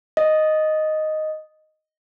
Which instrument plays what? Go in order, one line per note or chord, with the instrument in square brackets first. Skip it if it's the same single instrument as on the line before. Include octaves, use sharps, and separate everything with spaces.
[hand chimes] D#5